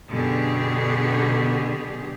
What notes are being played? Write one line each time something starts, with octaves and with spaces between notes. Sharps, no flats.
F#2 B2 D3 G4 G#4